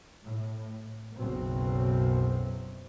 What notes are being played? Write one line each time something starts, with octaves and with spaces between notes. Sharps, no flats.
A2
F#1 B1 F#2 B2 C4